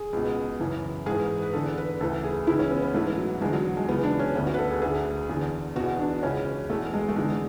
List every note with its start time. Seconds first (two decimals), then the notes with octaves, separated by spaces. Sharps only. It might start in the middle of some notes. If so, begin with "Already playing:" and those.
Already playing: G#4
0.13 C#2 B2
0.60 F#2 C#3 E3
1.06 G#2 E3 G#4
1.42 B4
1.53 E2 D3 A4
1.78 B4
2.00 D2 C#3 E3 A4
2.24 G#4
2.47 C#2 C#3 E3 E4
2.59 C#4
2.71 B3
2.82 B3
2.94 G#2 E3 A3
3.18 F#3
3.41 E2 G#3
3.44 D3
3.53 F#3
3.77 G#3
3.88 C#2 C#3 E3 B3
4.03 D4
4.19 C#4
4.35 D2 D3 B3
4.47 F#4
4.54 B4
4.58 A4
4.71 G#4
4.82 D2 D3 G#4
5.29 E2 D3
5.76 B2 F#4
5.80 E2
5.99 D4
6.23 C#2 C#3 E3 C#4
6.70 E2 B2 A3
6.93 G#3
7.08 A3
7.16 E2 D3 G#3